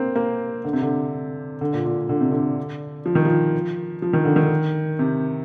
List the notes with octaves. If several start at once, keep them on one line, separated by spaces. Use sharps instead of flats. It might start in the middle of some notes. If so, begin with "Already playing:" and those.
Already playing: A#3 C4
A#3
D3
C3
D3
D3
A#2
A#2
D3
C3
D3
F3
D#3
F3
F3
D#3
D3
D#3
C3